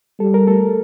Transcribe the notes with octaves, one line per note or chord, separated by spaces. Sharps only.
G3 A4
A#4
A3 A4